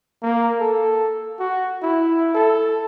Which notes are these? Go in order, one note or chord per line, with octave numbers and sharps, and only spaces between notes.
A#3
A4
F#4
E4
A4